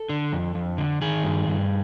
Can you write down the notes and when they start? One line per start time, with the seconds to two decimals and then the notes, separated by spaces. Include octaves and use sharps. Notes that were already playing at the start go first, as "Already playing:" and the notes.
Already playing: A4
0.09 D3
0.32 F2
0.55 F2
0.78 D3
1.01 D#3 G#4
1.24 G2
1.47 G2